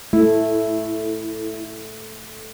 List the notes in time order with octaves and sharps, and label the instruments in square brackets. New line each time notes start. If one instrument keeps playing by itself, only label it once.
[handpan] A3 [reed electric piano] E4